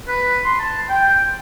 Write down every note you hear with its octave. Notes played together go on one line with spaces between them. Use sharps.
B4
C6
A5
G5